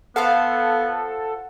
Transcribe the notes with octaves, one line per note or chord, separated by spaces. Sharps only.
B3 F4 A4 C5 F5 F#5